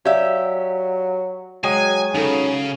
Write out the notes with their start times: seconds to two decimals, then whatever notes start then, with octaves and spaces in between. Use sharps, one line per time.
0.05 F#3 G4 D5 E5 F5
1.64 F#3 G#3 G5 G#5 D#6
2.14 C#3 F#3 D#4 A4